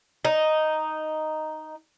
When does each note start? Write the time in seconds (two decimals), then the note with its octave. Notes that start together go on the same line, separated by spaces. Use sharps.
0.25 D#4